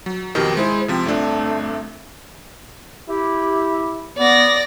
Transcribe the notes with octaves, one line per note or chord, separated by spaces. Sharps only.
F#3
F2 B2 D#3 G4
G#3 E4 G#4 C5
C3 F3 C4
G1 A3 C4 D4
E4 G4
B3 D5 A#6